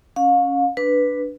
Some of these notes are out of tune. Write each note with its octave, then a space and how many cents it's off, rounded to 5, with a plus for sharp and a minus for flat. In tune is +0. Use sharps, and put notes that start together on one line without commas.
C#4 +0 F5 +35
D4 +0 B4 +0